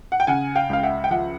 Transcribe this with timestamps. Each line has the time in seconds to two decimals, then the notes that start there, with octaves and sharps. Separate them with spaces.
0.12 F#5
0.20 G5
0.27 C#3 F#5 G#5
0.56 F5 G5
0.70 C#2 F5
0.83 E5 F#5
1.04 G5
1.11 F3 E5 F#5